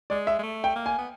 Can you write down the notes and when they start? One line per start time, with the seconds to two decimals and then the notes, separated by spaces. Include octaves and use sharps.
0.10 G#3 D5
0.27 E5
0.39 G#3
0.43 A3
0.64 G5
0.75 A#3
0.86 G#5
0.98 B3